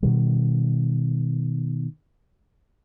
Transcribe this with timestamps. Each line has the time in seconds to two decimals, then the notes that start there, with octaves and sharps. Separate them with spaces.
0.03 B2 D#3 G3